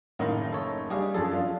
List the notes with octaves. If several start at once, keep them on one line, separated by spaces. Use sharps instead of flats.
F#1 A2 D#3 D#4 F5
A4 C#5
G3 D4 G4 G#4 F5
F#2 F3 G#4 A4
D4 F4